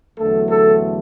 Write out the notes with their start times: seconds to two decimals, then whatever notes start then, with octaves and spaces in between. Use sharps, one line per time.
0.18 E2 D3 F#3 A3 A4
0.49 A4